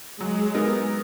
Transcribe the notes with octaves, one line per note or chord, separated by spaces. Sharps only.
F#3 G#3
B3 D#4 A#4